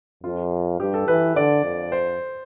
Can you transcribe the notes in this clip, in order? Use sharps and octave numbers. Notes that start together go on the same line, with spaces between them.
F2 F4
G2 G4
A4
E3 B4
D3 D5
F2
C5